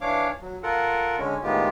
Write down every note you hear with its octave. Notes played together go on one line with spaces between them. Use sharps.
E3 D4 C#5 F5 D6
F#3
F4 A4 A#4 F#5
D3 G#3 C#4
A2 D#3 G#3 B3 F4 G4